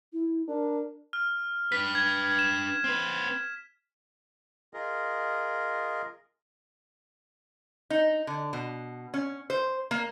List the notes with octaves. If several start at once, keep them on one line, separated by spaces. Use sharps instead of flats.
E4
D4 A#4
F6
D4 B4 B6
G#6
E7
C4 B4
F4 G#4 A#4 D#5
D#4
D3
B2
C#4
C5
A#3